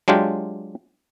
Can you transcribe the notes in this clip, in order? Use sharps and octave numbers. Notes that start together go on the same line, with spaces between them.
F#3 G#3 D4 F4 G4